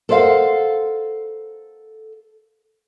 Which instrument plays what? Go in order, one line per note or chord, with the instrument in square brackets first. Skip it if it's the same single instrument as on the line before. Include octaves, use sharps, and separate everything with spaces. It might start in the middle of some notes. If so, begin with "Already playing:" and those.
[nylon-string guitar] A4 A#4 C5 D5 F5 F#5